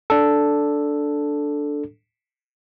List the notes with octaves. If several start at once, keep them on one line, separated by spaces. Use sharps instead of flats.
D4 A4